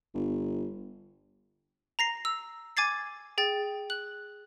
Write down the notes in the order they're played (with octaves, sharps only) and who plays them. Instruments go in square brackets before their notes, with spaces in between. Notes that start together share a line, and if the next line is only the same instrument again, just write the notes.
[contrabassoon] G1
[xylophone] A#5 A#6 C7
E6
G#5 D6 G#6 A6 C7
G#4 G5 A6
F#6 F#7